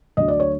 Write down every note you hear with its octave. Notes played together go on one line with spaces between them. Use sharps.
D2 D3 F#3 D#5
D5
C#5